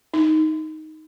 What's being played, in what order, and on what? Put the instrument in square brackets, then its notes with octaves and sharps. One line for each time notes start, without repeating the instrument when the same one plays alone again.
[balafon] D#4